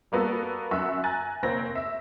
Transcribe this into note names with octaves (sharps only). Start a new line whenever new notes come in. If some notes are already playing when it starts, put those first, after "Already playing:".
G3 A#3 B3 F#4 A4
F#2 E5 F#5 C#6 F#6
G#5 A#5 F#6 A6
F1 A#3 C4 C#5 A#6
E5